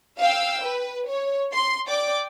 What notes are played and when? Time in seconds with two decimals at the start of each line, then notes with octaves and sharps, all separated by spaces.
0.20 F5 G5 E6
0.64 B4
1.09 C#5
1.53 C6
1.88 D5 G5 D6